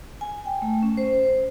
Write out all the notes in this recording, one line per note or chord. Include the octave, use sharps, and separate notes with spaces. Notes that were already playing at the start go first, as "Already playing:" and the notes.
G#5
G5
A3
C#4
C5